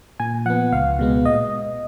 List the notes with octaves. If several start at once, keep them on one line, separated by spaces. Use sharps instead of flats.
A#2 G#5
F3 B3 F#5
C#2 F5
B2 G#3 B3
A#2 D#5